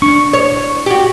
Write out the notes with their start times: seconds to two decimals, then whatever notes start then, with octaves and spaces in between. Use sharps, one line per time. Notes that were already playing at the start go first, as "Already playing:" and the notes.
0.02 D4 C#6
0.33 C#5
0.86 F#4 G4